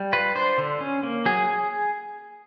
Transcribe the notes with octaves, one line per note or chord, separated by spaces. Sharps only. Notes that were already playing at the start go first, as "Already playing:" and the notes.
Already playing: G3
F4 B4
D4 C5
D3
C#4
A#3
F#3 G#4